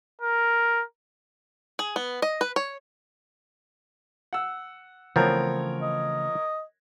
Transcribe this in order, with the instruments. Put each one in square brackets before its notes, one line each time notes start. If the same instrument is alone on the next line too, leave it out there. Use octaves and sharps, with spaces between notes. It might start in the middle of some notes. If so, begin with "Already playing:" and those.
[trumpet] A#4
[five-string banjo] G#4
B3
D#5
B4
C#5
[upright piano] F#5 E6
[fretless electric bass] C#3 E3 A3 [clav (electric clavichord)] F3 B3 C4 [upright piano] A#4 C#5
[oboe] D#5